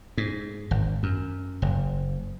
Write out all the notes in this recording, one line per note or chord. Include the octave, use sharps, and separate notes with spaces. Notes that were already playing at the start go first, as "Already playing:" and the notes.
G#2
G#1
F#2
F#1